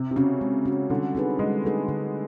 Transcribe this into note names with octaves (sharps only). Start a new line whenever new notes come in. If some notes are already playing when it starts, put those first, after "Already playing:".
Already playing: C3
C3
C#3 C#4 F#4
G#3
C#4 F#4
D3 G3
C4 D#4 G#4 B4
G3 G#3
A3 C4 D#4 G#4 B4
D3